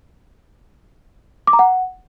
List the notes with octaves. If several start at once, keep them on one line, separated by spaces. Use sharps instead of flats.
D6
A#5
F#5